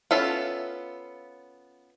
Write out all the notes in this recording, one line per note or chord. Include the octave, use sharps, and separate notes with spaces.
B3 C#4 F4 A4 E5